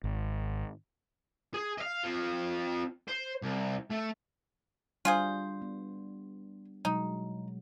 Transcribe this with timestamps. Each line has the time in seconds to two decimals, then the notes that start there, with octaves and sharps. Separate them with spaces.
0.04 G#1
1.54 G#4
1.78 D#5 F5
2.03 C4 F4
3.08 C5
3.43 C2
3.91 A3
5.05 G3 D4 F4 G#4 C5
5.62 B3
6.85 B2 F#3 G#3 D#4